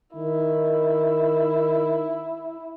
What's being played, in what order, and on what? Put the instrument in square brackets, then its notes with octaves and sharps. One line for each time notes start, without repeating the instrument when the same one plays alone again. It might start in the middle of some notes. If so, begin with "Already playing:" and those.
[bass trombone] D#3 [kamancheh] E4